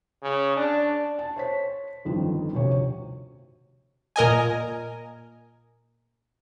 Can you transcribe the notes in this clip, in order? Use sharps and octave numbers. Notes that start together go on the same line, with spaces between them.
C#3
D4
A5
C5 C#5 B6
G1 F2 D#3 F3
D2 C3 C#5
A#2 A#4 D#5 G#5